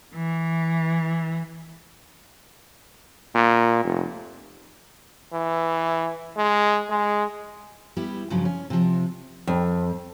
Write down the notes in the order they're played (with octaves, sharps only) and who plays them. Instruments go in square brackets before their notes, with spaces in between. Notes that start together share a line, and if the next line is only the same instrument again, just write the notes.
[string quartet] E3
[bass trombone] A#2
F1
[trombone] E3
G#3
G#3
[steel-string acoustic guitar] G3 B3 E4 G4
G2 C#3 F3 F#3
C#4
C3 F3
F2